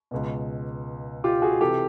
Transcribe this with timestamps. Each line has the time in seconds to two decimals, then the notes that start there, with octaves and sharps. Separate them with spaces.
0.11 C#2 B2
1.24 F4 G4
1.42 F#4 G#4
1.60 C3 E3 G4 A4